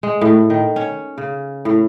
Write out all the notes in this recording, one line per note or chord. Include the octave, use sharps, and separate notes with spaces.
G#3
A2
D#3
C#4
C#3
A2